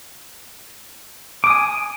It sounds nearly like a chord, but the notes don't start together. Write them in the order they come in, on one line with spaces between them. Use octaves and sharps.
D6 D#6 G#5